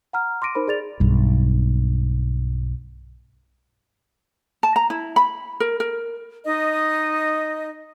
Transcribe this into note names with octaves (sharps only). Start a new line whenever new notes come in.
F#5 A#5 F6
C6 D6 A#6 D7 D#7
D#4 A#4 C5 B5
G#4 D5 A6 F7
B1 G2
A5
A#5
E4
B5
A#4
A#4
D#4 D#5